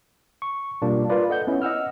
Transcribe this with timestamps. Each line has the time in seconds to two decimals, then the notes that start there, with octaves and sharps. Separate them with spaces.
0.42 C#6
0.82 B2 G3 A#3 D4 F4
1.10 F4 A#4 B4 D5
1.29 A4 D#5 F#5 G6
1.47 B3 C#4 E4
1.62 D#5 F#5 E6 F6